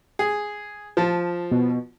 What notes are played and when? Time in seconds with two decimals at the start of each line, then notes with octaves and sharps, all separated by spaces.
0.19 G#4
0.97 F3 A5
1.51 B2